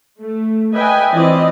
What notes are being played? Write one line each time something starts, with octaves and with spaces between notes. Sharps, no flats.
A3
B4 D#5 E5 G5 G#5
E3 C4 E4 F4 D5 D#5